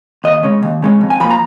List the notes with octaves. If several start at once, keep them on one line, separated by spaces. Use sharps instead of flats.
D#2 D#5
C#3 G#3 C#4
D#2
C#3 G#3 C#4
F2
G#5
F3 A#3 B5
A#5